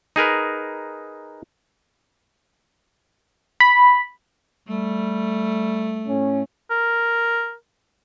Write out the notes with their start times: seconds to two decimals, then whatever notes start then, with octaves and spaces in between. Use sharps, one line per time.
0.16 D#4 G#4 A#4 B4
3.60 B5
4.68 G3 A3
6.07 A2 C#4
6.70 A#4